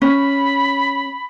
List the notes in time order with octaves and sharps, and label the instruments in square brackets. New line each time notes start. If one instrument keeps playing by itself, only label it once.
[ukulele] C#4 [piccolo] B5